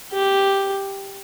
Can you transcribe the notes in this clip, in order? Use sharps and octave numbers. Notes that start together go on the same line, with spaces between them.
G4